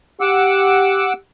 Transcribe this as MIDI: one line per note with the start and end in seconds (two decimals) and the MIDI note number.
0.21 1.18 67
0.21 1.13 78
0.21 1.13 86
0.21 1.13 88